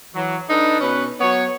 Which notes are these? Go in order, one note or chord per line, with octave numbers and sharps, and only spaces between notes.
E3 F#3
D4 D#4 A4 B4
B2 C#4 B4
F#3 B3 C#5